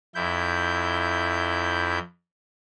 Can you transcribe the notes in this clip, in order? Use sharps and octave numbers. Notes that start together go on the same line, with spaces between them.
F2 E4 G6